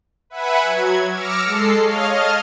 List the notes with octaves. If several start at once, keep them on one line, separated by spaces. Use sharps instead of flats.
B4 E5 F#5 G#5 B5
F#3 G#6
D6 E6 F6 A#6 C#7
G#3 A4 C7
C#5 D#5 F5 F6
D#5 A5 D#6 F6 G#6